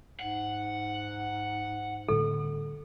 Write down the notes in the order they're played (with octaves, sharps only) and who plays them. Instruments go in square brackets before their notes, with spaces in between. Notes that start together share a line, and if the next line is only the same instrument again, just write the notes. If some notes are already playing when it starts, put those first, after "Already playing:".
[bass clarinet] G#2 [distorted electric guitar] F#5
[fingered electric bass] A2 D3 G3 [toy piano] A4